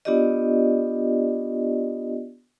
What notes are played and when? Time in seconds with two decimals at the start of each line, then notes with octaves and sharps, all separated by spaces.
0.05 B3 D4 F4 G4 D5 D#5